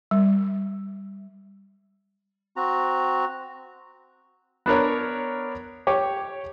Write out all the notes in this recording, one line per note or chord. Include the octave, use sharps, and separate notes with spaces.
G3
C4 F#4 A#5
B3 D4 A#4 C#5
G4 C#5 D6